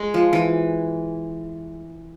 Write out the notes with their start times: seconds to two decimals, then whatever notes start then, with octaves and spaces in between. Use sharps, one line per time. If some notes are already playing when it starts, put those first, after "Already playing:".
Already playing: G#3
0.14 F3
0.33 E3